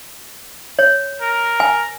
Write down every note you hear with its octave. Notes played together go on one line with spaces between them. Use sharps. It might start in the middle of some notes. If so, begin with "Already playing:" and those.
C#5
A#4
G#5